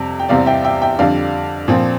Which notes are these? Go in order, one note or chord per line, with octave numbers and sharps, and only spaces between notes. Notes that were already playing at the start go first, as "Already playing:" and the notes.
Already playing: F2 C3 G3
G5
E2 C3 G3 C4 D5 F5
E5 G5
E5 G5
E5 G5
F2 D3 G3 D5 F5
A#2 F3 C4